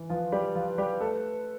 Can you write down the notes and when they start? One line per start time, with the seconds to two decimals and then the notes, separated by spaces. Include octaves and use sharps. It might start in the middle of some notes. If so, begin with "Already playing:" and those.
Already playing: E3
0.10 F3 F4 B4
0.32 G3 G4
0.55 F3 F4
0.78 G3 G4
1.01 A3 A4